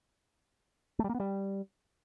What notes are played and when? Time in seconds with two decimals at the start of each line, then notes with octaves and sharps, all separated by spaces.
0.99 A3
1.04 G3
1.09 A#3
1.15 B3
1.20 G3